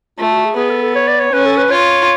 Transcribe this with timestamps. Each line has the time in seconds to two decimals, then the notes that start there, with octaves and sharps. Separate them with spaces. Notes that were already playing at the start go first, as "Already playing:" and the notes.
0.19 A3 F4
0.32 F#4
0.45 G#4
0.57 B3 G#4
0.70 A4
0.83 A4
0.96 C#5
1.08 D5
1.20 C#5
1.32 C#4 B4
1.46 A4
1.58 B4
1.71 F4 C#5